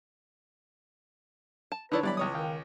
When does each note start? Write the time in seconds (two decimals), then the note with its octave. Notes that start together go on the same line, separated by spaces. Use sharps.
1.72 A5
1.92 D3 D#4 E4 B4 C#5 D5
2.03 E3 F#3 G3 B3 E4 B4 D5 B5
2.17 C#2 C#5 D#6
2.34 D#3 F5 G5